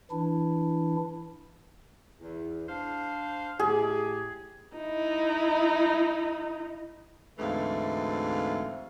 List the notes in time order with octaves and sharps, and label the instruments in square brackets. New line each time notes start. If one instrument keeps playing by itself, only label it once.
[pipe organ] E3 D4 E4
[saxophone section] E2
D4 C5 F5
[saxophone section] A2 G4 [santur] G#4
[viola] D#4 E4
[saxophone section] D2 G#2 E3 A3 C4 F5